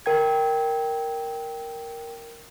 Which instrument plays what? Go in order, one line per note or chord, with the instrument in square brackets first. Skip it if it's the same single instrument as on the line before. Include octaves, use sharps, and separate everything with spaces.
[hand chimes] A#4 G5 G#6